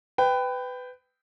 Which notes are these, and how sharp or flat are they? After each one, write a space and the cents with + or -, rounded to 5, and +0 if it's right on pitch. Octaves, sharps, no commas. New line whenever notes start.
B4 +20 G5 +0